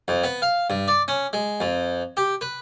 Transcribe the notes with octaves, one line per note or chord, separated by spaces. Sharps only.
F2
B3
F5
G2
D5
C#4
G#3
F2
G4
B4